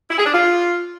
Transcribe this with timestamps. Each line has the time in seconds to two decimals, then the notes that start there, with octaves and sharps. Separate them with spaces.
0.10 E4
0.18 G#4
0.26 D4
0.33 F4